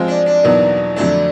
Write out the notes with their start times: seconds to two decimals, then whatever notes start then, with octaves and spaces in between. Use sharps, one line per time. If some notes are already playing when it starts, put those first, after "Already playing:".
Already playing: F3 G#3 C4 F4
0.08 D4
0.26 D4
0.43 E2 B2 F#3 A#3 D#4
0.96 F2 D3 F#3 A3 D4